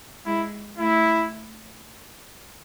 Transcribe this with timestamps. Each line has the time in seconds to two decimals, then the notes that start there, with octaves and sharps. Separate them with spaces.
0.25 G#3 E4
0.78 A3 E4